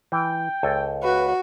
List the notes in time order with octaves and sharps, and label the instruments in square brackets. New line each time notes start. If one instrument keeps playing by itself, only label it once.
[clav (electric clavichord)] E3 [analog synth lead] G5
[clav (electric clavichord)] C#2 A4 G#5
[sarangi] F#4 [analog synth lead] B4